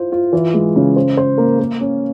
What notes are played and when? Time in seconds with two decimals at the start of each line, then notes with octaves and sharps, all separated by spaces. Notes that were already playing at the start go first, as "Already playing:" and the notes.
Already playing: E4 F4 C5
0.12 F4
0.33 E3
0.54 G#3
0.76 C#3
0.96 C5
1.17 C5
1.38 A#3
1.60 A#3
1.81 C#4